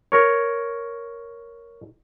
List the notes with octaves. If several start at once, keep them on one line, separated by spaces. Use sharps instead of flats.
A#4 C#5